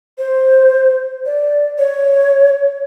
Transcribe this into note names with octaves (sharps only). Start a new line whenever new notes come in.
C5
D5
C#5